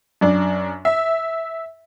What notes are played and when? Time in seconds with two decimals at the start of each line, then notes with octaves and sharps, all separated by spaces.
0.21 F#2 D4
0.85 E5